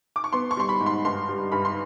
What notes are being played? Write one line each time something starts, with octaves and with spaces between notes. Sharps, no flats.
D6
C#6
B3 C6
C#6
G3 C6
B5
G#2
C6
G2 C6
G3
G2 B5
C6